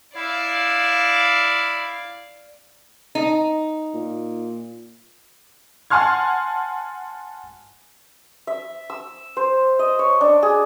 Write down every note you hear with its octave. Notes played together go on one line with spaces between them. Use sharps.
E4 D5 F5
D#4
A#2
F#5 G#5 A5 C6 F6 G#6
E5
E6
C5
D#5
C#5
D4
G#4